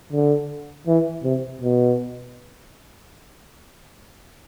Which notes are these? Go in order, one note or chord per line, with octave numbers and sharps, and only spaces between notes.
D3
E3
C3
B2